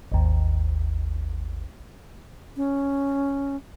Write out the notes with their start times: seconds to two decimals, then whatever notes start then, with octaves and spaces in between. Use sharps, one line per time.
0.12 G#1 D#2
2.57 C#4